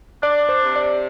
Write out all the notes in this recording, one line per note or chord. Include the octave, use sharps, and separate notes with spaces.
D4 D5
C5
C3
D5